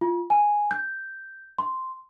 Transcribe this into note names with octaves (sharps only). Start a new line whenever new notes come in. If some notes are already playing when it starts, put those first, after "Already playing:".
F4
G#5
G6
C6